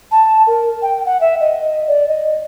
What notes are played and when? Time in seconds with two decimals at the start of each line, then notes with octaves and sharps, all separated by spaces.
0.11 A5
0.47 A#4
0.82 G5
1.06 F#5
1.21 E5
1.41 D#5
1.88 D5
2.08 D#5